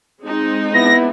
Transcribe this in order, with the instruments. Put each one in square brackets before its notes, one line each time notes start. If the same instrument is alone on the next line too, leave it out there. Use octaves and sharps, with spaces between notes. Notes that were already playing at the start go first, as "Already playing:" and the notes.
[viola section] G#3 C4 D#4
[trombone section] B3 E4 [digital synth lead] A#6